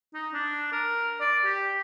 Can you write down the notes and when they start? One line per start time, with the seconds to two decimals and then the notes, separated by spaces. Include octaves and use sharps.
0.14 D#4
0.33 D4
0.72 A#4
1.20 D5
1.45 G4